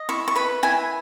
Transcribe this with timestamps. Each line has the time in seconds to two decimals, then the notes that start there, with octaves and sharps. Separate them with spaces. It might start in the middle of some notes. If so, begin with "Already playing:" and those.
Already playing: D#5
0.09 E4 C#6
0.28 C#6
0.36 B4 B5
0.63 E4 G#5